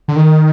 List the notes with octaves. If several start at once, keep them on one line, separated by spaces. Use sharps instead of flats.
D3
D#3